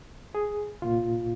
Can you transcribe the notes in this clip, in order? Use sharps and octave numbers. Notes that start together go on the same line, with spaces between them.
G#4
C2 A#2 F4